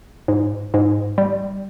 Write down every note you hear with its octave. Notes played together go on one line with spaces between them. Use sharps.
G#2
G#2
G3